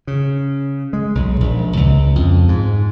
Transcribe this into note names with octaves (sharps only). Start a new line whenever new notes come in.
C#3
G#3
B1
A#1
C#2
F2
G#2